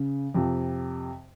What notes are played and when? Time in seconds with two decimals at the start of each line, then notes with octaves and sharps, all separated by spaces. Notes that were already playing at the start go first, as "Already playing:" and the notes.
Already playing: C#3
0.35 F2 C3 F3